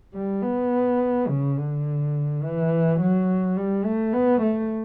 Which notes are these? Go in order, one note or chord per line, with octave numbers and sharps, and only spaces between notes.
G3
B3
C#3
D3
E3
F#3
G3
A3
B3
A3